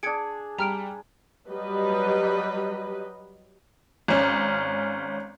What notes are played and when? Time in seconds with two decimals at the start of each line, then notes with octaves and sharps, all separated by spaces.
0.03 D4 G#4 G#6 C#7 D7
0.58 G3 A#5 F6 D7
1.49 F#3 G3 B4 D#5
4.08 G#1 C#4